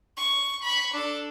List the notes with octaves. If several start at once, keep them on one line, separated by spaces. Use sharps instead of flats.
C#6
B5 C#6
D4 A4